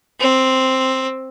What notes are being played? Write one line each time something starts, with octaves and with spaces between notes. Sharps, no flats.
C4